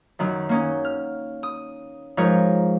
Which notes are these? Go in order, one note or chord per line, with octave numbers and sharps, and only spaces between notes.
F#2 D#3 F#3
A#3 C#4 D#4
F6
D#6
G#2 F3 A#4 C#5